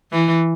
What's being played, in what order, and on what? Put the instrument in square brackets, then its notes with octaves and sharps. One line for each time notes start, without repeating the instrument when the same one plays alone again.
[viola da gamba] E3